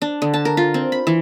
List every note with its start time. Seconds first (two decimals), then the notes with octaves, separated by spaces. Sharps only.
0.02 D4
0.22 D3
0.34 A5
0.45 A#4
0.57 F4
0.74 C4
0.92 B5
1.07 E3